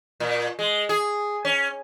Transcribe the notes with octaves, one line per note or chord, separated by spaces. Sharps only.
A#2
G#3
G#4
C#4